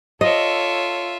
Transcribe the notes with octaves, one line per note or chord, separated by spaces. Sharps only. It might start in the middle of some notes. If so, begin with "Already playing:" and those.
F4 A4 C#5 D#5 E5